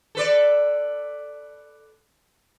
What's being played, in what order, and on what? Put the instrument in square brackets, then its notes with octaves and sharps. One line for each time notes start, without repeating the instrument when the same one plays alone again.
[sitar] A4 B4 D5